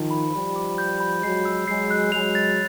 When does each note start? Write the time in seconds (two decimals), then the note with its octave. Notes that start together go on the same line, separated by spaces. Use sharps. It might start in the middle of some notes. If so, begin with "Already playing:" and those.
Already playing: D#3 F3
0.11 B5
0.34 F3 G3 B5
0.56 D6
0.78 G6
1.00 B5
1.22 F#3 G#3 C7
1.45 E6
1.68 F#3 G#3 C7
1.91 F#6
2.12 F#3 G#3 F7
2.35 A6